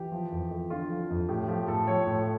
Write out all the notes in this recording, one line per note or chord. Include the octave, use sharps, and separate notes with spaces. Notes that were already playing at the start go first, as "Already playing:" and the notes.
Already playing: E3 G4
F3
F2
F2
D3 F4
F3
F2
A2 G4
F3 G4
A2 A4
F3 C#5
A2